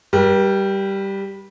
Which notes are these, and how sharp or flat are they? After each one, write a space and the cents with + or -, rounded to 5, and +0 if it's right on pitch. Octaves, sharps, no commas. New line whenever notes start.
G3 +0 A#4 +45